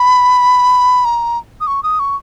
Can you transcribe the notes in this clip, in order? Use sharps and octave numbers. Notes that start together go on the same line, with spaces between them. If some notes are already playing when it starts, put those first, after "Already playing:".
Already playing: B5
A#5
D#6
C#6
D#6
C#6